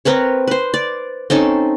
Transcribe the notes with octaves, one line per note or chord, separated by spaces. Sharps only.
C4 A#4 B4 C#5
B4 C5
D5
C4 C#4 D#4 A4